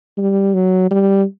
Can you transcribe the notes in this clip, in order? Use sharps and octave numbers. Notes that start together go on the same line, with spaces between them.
G3
F#3
G3